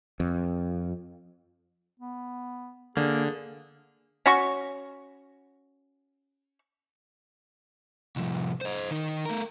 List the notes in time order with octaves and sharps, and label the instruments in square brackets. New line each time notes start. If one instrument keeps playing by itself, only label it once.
[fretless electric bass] F2
[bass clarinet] B3
[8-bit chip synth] D3 [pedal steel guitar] A#3 [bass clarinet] G#4
[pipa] C#4 F#4 C#6
[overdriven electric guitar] C2 F3
C5 D#5
D#3 D#4
A3 A#4